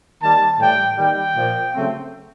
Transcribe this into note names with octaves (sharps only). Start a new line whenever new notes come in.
D#3 G3 A#3 A5
A2 E3 G3 G5
D#3 G3 A#3 G5
A#2 F3 A#3
C#3 F#3 A3 C4